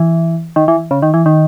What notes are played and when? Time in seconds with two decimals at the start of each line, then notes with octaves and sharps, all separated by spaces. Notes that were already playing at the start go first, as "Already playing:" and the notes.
Already playing: E3
0.56 D#3
0.68 E3
0.91 C#3
1.02 D#3
1.14 E3
1.26 D#3